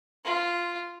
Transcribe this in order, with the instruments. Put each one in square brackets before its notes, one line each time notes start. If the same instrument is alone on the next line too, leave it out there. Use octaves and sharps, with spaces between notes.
[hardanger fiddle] F4